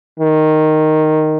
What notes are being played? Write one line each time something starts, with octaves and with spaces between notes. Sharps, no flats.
D#3